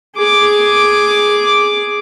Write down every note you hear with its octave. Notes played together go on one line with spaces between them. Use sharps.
G#4 D6